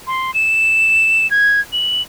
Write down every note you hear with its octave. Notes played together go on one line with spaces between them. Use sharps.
C6
E7
G#6
F#7